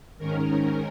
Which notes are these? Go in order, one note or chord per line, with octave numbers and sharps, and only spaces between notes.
G#2 D#3 C#4 A#4